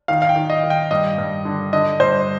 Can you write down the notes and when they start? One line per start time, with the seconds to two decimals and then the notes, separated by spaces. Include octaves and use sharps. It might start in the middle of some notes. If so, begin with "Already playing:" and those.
0.08 D#3 F5
0.22 F5
0.29 G5
0.36 D#3
0.50 D#5
0.63 D#3
0.70 G5
0.91 G2 D#5
1.18 G2
1.45 D3
1.73 D3 D#5
2.00 G2 C5